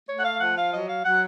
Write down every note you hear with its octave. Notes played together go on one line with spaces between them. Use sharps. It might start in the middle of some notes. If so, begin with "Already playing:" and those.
A3 C#5
F#5
F5
F3 F#5
F5
F#3 D#5
F5
F#3 F#5